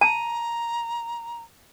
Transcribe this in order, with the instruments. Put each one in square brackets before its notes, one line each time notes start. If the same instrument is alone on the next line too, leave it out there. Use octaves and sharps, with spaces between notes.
[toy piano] A5 [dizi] A#5